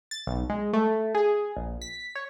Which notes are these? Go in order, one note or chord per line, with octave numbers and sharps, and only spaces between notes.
A6
B1
G#3
A3
G#4
A#1
B6
C#5